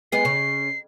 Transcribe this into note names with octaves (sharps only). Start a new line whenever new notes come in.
G#3 B3 G#4 C7
C#3